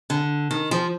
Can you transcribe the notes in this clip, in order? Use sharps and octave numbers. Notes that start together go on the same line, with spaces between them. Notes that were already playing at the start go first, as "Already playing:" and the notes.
D3
D#3
F3